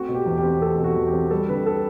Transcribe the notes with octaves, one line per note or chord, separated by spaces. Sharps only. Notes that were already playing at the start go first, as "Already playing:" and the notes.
Already playing: A3 C4 F#4
B2
G4
E2
G4
C4
A3 A4
B2
F#4
E2
G4
C4
G3 A4
D3 B4
A4